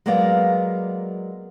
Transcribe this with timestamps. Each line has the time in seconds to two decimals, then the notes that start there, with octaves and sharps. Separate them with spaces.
0.06 F#3 G#3 A#3 B3 D5 F5